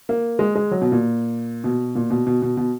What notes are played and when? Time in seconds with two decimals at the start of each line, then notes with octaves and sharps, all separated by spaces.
0.09 A#3
0.39 G#3
0.55 G#3
0.71 F#3
0.82 B2
0.92 A#2
1.64 B2
1.95 A#2
2.10 B2
2.27 B2
2.42 B2
2.57 B2